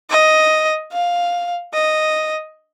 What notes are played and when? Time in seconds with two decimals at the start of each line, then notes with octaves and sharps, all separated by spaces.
0.10 D#5
0.93 F5
1.74 D#5